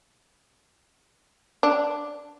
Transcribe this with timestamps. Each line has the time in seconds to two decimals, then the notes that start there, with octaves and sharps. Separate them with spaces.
1.63 D4